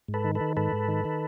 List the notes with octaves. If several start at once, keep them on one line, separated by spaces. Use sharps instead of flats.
G#2
A4 B4
D#3
A4 B4
D#3
G#2 A4 B4
G#2
D#3
D#3